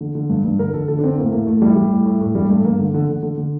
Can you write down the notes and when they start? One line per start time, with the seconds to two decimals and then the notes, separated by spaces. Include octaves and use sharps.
0.01 D3
0.15 D3
0.30 G2
0.45 G2
0.59 D3 A#4
0.74 D3 A4
0.88 D3 A4
0.99 D4
1.03 D3 C4
1.18 A2 A#3
1.32 A2 A#3
1.47 A2 A3
1.61 A2 G3
1.76 A2 G3
1.91 A2
2.06 A2
2.21 A2
2.35 G2 G3
2.50 G2 A3
2.64 G2 A#3
2.79 D3
2.94 D3
3.09 D3
3.23 D3
3.38 D3